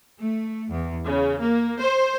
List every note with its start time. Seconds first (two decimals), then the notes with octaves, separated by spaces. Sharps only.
0.18 A3
0.70 E2
1.05 C#3
1.40 A#3
1.81 C5